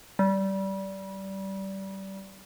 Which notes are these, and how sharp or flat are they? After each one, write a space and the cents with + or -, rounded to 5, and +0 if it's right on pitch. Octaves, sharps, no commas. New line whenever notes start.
G3 -20